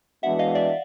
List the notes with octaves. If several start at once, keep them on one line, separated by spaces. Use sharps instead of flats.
E3 G#3 B3 D4 F#4 E5 F#5
D#5 F5
D5 E5